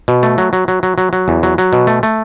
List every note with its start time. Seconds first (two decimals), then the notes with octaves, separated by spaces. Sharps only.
0.08 B2
0.23 A3
0.38 F#3
0.53 F#3
0.68 F#3
0.83 F#3
0.98 F#3
1.13 F#3
1.28 E2
1.43 F#3
1.58 F#3
1.73 B2
1.87 A3
2.03 A3